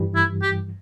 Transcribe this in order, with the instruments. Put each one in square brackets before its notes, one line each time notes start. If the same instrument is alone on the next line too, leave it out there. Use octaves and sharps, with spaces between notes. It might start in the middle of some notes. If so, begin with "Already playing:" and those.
Already playing: [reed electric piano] G2 E3 G3
[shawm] E4
G4